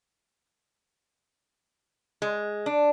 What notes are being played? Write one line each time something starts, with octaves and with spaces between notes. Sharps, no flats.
G#3
D4